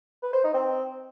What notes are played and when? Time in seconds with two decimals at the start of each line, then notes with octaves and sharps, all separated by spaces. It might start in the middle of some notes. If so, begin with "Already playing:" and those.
0.23 B4
0.33 C5
0.44 D#4
0.54 C4